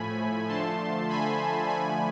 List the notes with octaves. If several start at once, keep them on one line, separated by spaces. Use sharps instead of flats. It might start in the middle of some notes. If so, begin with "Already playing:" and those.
Already playing: A2 F3 A3 G#5 B5
D3 F3 A3 A5 C6
G#5 B5
D3 F3 A3 G#5 B5